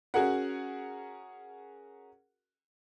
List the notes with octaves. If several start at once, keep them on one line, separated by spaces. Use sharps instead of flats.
C#4 F#4 G#4 A#4 F#5